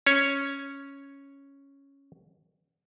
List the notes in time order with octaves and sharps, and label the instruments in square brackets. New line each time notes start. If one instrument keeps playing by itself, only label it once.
[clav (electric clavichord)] C#4 C#5